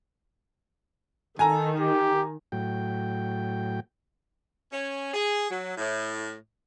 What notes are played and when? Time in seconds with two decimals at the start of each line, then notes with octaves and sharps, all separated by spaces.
1.39 D#3 A4 G#5 A#5
1.80 G4
2.52 A2 F#3 G5
4.71 C#4
5.13 G#4
5.50 F#3
5.77 A2